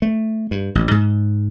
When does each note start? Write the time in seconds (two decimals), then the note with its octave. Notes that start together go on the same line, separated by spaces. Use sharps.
0.02 A3
0.51 G2
0.75 A1
0.91 G#2